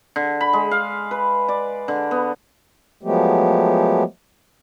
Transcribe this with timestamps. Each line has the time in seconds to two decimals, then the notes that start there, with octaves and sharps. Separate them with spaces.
0.16 D3
0.41 B5
0.53 G#3
0.71 F5
1.11 B4
1.48 D5
1.88 D3
2.11 B3
3.03 F3 F#3 G#3 A3 B3 G4